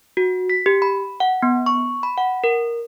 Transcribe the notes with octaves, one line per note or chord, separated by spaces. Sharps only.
F#4
B6
G4
B5
F#5
B3
C#6
B5
F#5
A#4